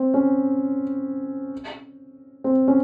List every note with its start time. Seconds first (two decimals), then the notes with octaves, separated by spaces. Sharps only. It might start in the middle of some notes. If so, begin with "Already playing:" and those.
Already playing: C4
0.14 C#4
2.44 C4
2.68 C#4